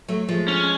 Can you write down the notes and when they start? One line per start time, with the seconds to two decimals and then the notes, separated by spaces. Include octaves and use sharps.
0.08 F#3 A3
0.28 F3 G#3
0.48 C#4